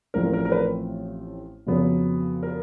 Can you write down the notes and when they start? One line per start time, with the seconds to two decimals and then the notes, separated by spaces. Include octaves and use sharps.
0.14 A1 A2 F3 A3 C4 A#4
0.33 A#4
0.45 A#4
0.52 B4
1.66 F2 C#3 F#3 B3
2.43 A#4